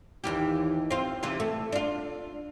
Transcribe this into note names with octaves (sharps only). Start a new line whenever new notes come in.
D#2 E3 G4
C4 F4
C3 E3 F4
A3
D4 F4